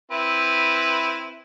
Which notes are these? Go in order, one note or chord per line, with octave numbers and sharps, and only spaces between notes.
C4 E4 B4